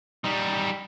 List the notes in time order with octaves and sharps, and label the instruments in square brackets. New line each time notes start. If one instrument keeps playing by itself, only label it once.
[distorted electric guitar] G3 D#4